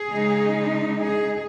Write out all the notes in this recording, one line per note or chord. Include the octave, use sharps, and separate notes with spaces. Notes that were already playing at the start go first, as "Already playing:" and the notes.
Already playing: G#4
C#3 G#3 D#4
G#4